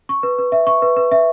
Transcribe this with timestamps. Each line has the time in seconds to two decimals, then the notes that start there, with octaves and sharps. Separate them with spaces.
0.09 C#6
0.23 B4
0.38 B4
0.52 E5
0.67 C#6
0.82 B4
0.96 B4
1.11 E5